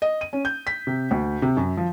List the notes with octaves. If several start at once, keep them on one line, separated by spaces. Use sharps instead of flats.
D#5
D#7
C#4
G6
B6
C3
D2
C3
F#2
F3